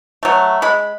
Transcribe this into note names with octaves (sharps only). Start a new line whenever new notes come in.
F#3 A3
G#3 B5